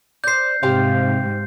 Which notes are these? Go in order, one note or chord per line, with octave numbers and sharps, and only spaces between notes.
C5 D5 G6 C7
G#2 C3 G4 C5 F5